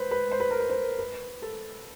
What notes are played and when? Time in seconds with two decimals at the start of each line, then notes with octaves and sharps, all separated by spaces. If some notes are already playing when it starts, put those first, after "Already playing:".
Already playing: B4 C5
0.11 B4
0.32 C5
0.40 B4
0.50 A#4
0.60 B4
0.70 C5
0.99 B4
1.42 A4